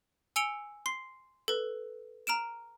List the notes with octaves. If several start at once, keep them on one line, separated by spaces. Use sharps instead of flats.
G#5 E6 C#7 D7 F7 G7
C6 C7
A4 B4
A#5 F6 D7 E7